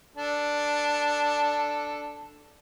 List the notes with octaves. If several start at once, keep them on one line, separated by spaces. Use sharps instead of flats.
D4 A4